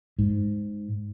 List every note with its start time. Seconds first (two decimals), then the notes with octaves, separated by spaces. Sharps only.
0.19 G#2